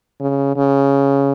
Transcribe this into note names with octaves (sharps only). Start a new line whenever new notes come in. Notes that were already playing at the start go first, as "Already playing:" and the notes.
C#3
C#3